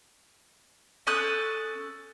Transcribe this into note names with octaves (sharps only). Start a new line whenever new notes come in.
C#4 A4 D#6 F#6